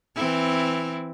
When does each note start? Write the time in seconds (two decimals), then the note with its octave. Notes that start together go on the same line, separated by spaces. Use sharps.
0.15 E3 C4 E4